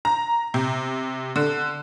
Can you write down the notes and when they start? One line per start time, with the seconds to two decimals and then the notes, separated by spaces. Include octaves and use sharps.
0.05 A#5
0.54 C3
1.36 D3